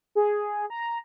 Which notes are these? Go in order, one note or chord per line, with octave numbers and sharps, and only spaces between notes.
G#4
A#5